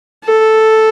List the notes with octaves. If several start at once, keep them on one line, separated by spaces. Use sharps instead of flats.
A4